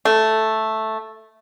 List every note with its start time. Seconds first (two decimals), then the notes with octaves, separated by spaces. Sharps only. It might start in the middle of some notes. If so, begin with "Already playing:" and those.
0.05 A3